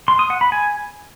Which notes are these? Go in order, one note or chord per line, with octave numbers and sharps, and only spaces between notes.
C6
D#6
F#5
B5
G#5